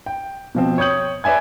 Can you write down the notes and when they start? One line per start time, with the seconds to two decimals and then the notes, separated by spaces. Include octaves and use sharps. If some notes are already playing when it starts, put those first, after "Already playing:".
0.06 G5
0.55 B2 F3 C4
0.78 C#5 G5 D#6 G6 F#7
1.24 B4 D5 E5 G#5 G#6